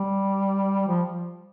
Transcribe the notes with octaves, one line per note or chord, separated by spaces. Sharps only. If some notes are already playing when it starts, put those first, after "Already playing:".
Already playing: G3
F3